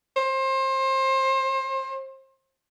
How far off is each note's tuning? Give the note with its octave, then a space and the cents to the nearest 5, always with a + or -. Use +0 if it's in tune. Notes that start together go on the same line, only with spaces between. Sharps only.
C5 +30